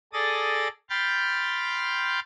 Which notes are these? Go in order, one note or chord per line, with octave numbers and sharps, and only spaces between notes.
G#4 A4 D5 D#6 A6 A#6
G5 B5 C6 F6 G6 A6